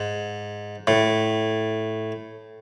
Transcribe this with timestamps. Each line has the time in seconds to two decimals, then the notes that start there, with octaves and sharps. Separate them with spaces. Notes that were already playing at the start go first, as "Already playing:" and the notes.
Already playing: G#2
0.87 A2